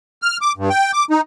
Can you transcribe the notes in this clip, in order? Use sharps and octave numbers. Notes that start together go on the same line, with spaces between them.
F6
D6
G2
G5
D6
D#4